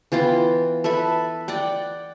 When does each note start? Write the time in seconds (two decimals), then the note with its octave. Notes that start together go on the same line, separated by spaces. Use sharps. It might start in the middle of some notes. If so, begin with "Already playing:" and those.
0.12 E3 B3 F4 G5
0.84 A4 B4 E5 B5
1.48 D5 F#5 G5